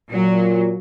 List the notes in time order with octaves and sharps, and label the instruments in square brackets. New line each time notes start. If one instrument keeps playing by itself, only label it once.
[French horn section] A#2 [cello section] F#3